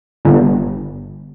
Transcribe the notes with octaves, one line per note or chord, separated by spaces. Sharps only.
G1